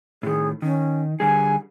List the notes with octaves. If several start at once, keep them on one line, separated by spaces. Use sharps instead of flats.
A2 D#3 G#4
D#3 C#4
D3 G3 G#4 G#5